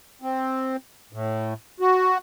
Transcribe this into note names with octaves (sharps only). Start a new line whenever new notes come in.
C4
A2
F#4